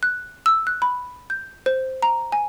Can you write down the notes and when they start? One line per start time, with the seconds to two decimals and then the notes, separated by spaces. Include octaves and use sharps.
0.03 F#6
0.46 E6
0.67 F#6
0.82 B5
1.30 G6
1.66 C5
2.02 A#5
2.32 G#5